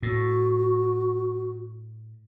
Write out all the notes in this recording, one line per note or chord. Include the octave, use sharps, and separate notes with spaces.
A2 F#4